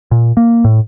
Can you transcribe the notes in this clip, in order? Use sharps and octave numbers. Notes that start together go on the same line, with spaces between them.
A#2
A#3
A2